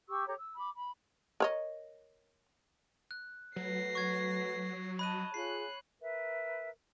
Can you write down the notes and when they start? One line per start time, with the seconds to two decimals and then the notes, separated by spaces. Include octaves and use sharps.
0.09 G4 C#6 E6
0.27 G4 A4 C#5 A#5
0.38 E6
0.57 B5 D6
0.77 B5
1.40 A#4 C#5 D#5
3.11 F#6
3.56 F#3 A3 F#4 B4 A#6 C7
3.95 C#6 G#6
4.99 D#5 A5 B5 F#6 D#7
5.34 F4 G#4 C#5 F#6 C7
6.01 A#4 B4 E5